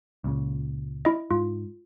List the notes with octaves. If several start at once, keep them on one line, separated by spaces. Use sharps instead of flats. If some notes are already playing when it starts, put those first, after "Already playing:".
C#2 A#2 C#3
E4 D#5
G#2 F4